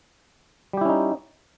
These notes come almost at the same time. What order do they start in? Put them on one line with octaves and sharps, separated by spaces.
G3 G4 E4 C#4 D#4